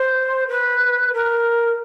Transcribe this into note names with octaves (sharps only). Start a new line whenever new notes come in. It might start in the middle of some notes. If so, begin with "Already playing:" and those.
Already playing: C5
B4
A#4